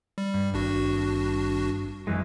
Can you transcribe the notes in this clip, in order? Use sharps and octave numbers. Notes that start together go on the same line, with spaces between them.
G3
G2
G#1 D4 F#4
F#2 E3 G#3